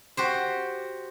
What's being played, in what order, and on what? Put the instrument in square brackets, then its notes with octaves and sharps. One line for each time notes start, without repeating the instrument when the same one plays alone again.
[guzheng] F#4 G4 C5